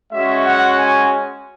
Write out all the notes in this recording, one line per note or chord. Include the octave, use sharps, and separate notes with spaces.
G#3 C#4 F#4 E5
F#5
G#5